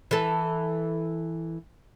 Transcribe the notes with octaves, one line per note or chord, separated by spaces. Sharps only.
E3 A4